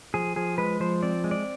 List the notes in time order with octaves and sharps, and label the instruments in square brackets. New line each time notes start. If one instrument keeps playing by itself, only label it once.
[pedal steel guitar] F3 G#4
F3 G#4
G#3 B4
F3 C5
C4 D5
G#3
D5